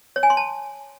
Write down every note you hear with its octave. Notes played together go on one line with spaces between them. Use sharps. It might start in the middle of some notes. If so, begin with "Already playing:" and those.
C#5
G#5
C6
A5